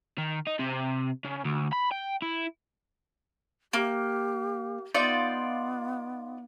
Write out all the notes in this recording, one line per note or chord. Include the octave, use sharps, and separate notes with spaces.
D#3
D#4
C3
C#3
D2
B5
G5
E4
A#3 G4
B3 D#4 F4 D5